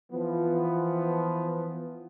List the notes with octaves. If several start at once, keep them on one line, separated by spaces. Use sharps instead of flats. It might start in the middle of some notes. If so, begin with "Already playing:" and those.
E3 F3 B3